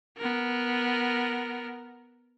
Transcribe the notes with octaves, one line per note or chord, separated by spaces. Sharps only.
B3 A#4